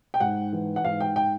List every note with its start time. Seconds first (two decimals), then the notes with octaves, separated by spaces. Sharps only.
0.14 G5
0.20 G#2 F#5
0.53 E3
0.76 F#5
0.84 G#2 F5
1.00 G5
1.16 G5